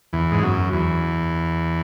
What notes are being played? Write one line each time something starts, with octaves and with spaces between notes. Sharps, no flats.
E2
G#2
F#2
E2